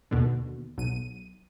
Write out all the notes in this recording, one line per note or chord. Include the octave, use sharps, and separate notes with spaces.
D#2 B2 D3
B1 D#7